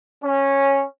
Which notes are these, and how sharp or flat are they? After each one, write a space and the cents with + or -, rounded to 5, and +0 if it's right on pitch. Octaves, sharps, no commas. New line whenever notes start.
C#4 -10